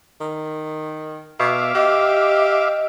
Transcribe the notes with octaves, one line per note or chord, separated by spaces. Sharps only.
D#3
B2 E5 F5 D6
G4 D#5